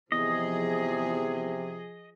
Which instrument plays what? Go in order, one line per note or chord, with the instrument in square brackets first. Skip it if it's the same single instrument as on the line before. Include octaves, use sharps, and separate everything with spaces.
[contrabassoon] E2 [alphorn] C3 [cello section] F3 G#4 [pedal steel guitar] D#5